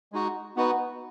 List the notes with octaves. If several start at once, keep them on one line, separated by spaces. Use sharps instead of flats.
G#3 D#4 F#4
B3 D#4 F#4 B4